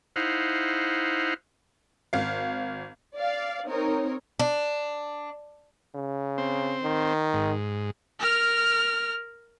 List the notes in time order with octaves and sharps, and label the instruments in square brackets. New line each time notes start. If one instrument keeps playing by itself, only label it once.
[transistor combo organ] D#4 E4 C5 F5 F#5
[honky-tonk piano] G#1 F5
[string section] D5 F5
C4 D#4 A#4 C#5
[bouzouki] D4
[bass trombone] C#3
[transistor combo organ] C4
[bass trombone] D#3
[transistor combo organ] G#2
[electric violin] A#4 F6